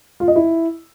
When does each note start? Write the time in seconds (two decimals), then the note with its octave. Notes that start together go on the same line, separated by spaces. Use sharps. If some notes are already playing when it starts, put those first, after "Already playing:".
0.20 F4
0.28 D#5
0.36 E4